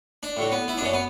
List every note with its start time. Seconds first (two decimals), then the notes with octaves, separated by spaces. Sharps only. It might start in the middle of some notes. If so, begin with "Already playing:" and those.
0.23 D4
0.37 A2 F#3
0.52 B3
0.68 E4
0.77 D4
0.81 F#2 C#4
0.94 B3